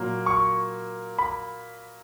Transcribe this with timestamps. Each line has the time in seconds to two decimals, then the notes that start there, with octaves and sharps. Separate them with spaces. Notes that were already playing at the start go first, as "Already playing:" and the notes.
Already playing: A#2 F#3 A#3
0.26 C#6
1.18 B5